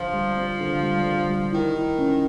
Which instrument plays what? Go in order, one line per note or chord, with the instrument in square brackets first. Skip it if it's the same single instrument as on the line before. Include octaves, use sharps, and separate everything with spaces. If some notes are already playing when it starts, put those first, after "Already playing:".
Already playing: [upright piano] D3 [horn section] F3
[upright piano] G3
C4
D3
G3
D3
G3
[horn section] D#3 [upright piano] E4
[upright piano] E4
C#4